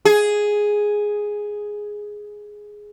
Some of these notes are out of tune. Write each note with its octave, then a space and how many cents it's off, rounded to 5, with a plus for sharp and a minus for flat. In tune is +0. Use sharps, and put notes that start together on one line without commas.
G#4 +0